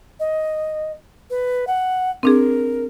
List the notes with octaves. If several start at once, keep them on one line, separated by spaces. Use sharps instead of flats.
D#5
B4
F#5
C4 D4 G#4 A#4